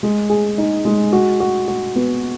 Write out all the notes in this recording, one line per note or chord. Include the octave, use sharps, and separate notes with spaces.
G#3
G#4
D#4
G#3
F#4
F#4
F#4
B3